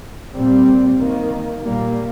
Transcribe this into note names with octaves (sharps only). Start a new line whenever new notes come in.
A#2 G3 C4
D#3 A#3
A#2 G3 A#3